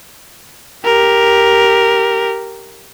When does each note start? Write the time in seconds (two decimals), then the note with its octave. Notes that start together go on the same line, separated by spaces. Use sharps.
0.85 G4 A#4